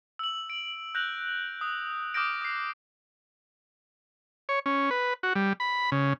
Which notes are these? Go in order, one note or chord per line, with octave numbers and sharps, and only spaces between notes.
E6 F#7
D7
F#6 G6 A#6 F7 F#7
D#6
D6 D#6 F6 G6 A#6 D7
D#6 C7
C#5
C#4
B4
F#4
G3
B5
C#3